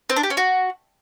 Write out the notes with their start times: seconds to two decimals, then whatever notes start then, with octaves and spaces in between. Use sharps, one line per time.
0.10 C4
0.16 D4
0.23 G4
0.30 C#4
0.37 F#4